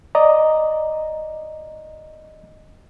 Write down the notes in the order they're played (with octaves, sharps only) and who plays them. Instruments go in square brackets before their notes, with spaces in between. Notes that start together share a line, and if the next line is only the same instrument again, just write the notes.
[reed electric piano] D5 D#5 A#5